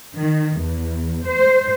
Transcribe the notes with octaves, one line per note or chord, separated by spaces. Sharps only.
D#3
E2
C5